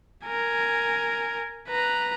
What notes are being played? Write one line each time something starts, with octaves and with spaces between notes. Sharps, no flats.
A#4 G#5
B4 A#5